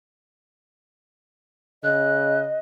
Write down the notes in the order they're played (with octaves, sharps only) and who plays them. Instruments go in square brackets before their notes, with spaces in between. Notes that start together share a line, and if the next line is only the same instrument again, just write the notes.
[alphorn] C#3 [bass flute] D#5 [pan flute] F#6